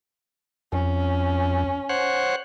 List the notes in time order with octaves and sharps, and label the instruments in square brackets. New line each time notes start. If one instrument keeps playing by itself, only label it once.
[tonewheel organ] F2 [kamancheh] C#4
[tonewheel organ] C5 C#5 F#5